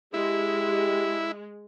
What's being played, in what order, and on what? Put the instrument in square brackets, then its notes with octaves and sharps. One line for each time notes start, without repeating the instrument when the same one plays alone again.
[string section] G#3 [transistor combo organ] E4 [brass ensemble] G4